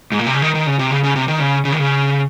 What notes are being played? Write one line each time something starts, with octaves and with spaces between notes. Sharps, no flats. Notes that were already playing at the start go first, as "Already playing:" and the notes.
G#2
A#2
C3
C#3
D#3
D#3
C#3
C3
C#3
C#3
C3
D#3
C#3
C#3
D#3
C#3